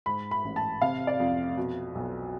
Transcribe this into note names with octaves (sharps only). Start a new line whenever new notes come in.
G#2 B5
B5
A1
A5
C3 F5
D5
F2
B2
B1